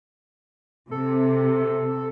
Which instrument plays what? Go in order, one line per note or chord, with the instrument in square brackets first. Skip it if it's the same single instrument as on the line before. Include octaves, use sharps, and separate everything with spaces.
[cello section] C3 [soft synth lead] A4